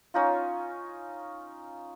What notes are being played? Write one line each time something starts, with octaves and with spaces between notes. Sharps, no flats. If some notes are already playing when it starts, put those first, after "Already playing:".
C#4 D#4 F4